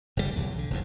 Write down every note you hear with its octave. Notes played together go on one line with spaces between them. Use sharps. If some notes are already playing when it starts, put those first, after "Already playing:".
F#1 G#2 C3 G3
B1 E2
D3
F1 D#2 G#2